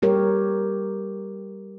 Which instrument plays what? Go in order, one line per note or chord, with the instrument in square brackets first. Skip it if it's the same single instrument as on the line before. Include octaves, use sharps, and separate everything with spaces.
[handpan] G3 G4 A#4 C#5